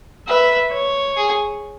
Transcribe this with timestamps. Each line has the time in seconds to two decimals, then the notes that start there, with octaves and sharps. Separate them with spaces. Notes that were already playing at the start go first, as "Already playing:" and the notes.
0.28 B4 E5
0.73 C#5
1.17 G#4